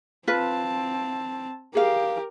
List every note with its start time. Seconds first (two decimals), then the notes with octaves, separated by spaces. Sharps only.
0.27 C4 F4 B4 A5
1.75 G4 G#4 A#4 F5